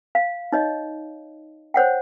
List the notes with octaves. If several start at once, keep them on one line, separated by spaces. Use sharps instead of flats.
F5
D#4 C#5 D#5
C5 C#5 F#5 G5